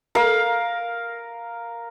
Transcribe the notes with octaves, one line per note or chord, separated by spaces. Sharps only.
A#4 F5